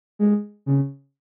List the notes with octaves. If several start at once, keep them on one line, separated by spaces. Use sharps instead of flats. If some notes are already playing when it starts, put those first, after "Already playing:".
G#3
C#3